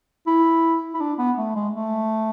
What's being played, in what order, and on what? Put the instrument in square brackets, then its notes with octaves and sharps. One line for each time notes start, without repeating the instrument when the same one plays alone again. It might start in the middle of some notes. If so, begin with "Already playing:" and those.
[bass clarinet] E4
E4
D4
B3
A3
G#3
A3